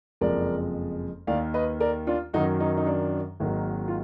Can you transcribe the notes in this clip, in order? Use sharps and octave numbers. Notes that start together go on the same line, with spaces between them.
F#1 F2 F3 G#3 A#4 D5
D#2 D#3 A#3 D5 F5
B4 D#5
A#4 D5
D4 F4
F#2 D#3 F#3 D#4 F#4
D#4
D#4
D4
G#1 G#2 D#3 F#3 A#3
F4